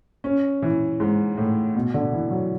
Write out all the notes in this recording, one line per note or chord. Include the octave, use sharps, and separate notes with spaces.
C#4
E3
G#2
A2
B2
D3
E3
F#3